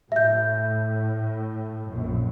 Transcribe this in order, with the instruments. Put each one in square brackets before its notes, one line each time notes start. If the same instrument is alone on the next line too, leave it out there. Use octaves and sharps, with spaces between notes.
[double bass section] A2 [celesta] E5 G6
[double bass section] A#1 F#2